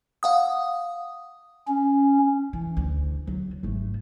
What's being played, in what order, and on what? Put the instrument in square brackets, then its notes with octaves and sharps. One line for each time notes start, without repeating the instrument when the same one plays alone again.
[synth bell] F5 F#5 D#6
[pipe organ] C#4
[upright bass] E3
D2
F#3
G#1 A3